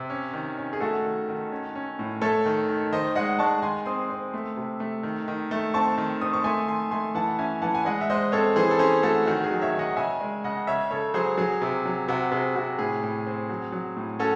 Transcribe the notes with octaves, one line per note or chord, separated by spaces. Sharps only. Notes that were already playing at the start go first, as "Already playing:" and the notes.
Already playing: C3
C#4
D#3
C#4
G#4
A3 F#4 A4
D#3
D#3
C#4
C#4
A2
A3 A4 C#5
D#3
D#3
D#3 C5 D#5
G#3 D#5 F#5
G#3 A5 C#6
D#3 G#5 C6
C4 C6 D#6
C4
A3
C3
A3
D#3
D#3
A3
C4 A5 C#6
D#3
C4 D#6
C#6
A3 G#5 C6
D#3 G#5 C6
A3 G#5 C6
E3 F#5 A5
C#4 E5 G#5
E3 F#5 A5
G#5
G#3 D#5 F#5
E5
G#3 C5 D#5
C4 A4 C#5
E3 G#4 C5
A4
C#4 G#4 C5
A3 F#4 A4
D#3 F#4
G#4
F#3
C#5 E5
D#3
D#5 F#5
C#3 E5 G#5
G#3
C#3 D#5 F#5
C#3 C#5 E5
C#3 A4 C#5
F#3 G#4 C5
F#3 G#4
C3
F#3
C3 F#4
C3 G#4
C3 F#4
A2 G#4
A2
C4
F#3
F#3
A2
C#4 F#4 A4